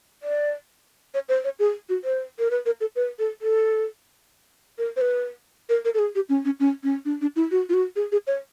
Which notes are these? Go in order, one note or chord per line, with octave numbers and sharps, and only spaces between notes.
D5
C#5
C5
C#5
G#4
F#4
C5
A#4
B4
A#4
A4
B4
A4
A4
A#4
C5
B4
A#4
A#4
A4
G#4
G4
C#4
C#4
C#4
C#4
D4
D4
E4
F#4
F4
F#4
G#4
G#4
C#5